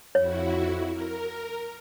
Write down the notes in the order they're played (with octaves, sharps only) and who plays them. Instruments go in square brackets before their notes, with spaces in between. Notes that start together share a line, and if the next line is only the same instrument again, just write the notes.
[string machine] F2 E4 F#4 [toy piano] C#5
[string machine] A#4